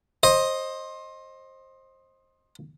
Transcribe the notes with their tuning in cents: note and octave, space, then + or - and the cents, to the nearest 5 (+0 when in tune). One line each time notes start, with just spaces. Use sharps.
C5 +20 D#5 +0